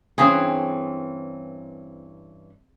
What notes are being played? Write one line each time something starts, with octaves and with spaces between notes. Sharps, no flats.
G2 E3 C4 C#4 G#4